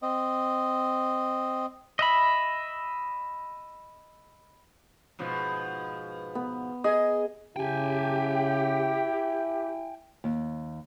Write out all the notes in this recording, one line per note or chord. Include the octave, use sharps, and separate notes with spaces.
C4 D#5
D#5 E5 B5
G#2 B2 F3
B3
G#4 D#5
C#3 E4 G4 G5 G#5
D#2